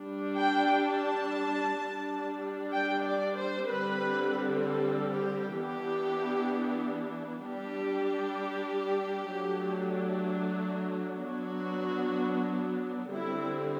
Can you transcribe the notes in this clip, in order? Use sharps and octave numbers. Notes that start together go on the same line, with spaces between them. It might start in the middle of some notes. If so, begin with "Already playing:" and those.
Already playing: G3 D4
G5
A5
G3 D4
G5
D5
C5
D3 G3 C4 B4
A4
G4
E3 B3 D4 G4
G3 D4 G4
F#3 A3 D4
F#3 B3 D4 F#4
D3 G3 C4 E4